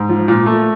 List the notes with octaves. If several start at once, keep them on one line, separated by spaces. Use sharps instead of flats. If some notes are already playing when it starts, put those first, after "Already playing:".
Already playing: G#2
F3
A#2
A3